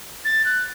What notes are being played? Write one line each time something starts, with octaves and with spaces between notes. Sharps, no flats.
A6
F#6